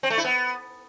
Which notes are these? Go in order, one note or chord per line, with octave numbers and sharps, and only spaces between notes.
C4
A3
E4
B3